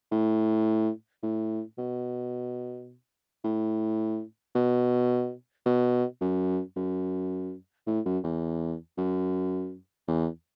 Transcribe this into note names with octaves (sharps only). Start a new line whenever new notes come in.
A2
A2
B2
A2
B2
B2
F#2
F#2
A2
F#2
E2
F#2
E2